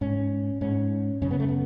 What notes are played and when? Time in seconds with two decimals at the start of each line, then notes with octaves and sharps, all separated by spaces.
0.01 G#2 C#4
0.61 G#2 C#4
1.22 F#2 C#3 C#4
1.31 B3
1.40 A3
1.48 B3